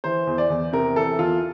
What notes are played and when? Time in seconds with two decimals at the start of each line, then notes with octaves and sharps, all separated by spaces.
0.04 E3 C5
0.27 E2
0.38 D5
0.50 E2
0.73 C3 A#4
0.96 E3 A4
1.19 E2 F4